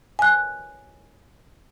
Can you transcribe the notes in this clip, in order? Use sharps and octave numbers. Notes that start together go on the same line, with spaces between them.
G#5 F#6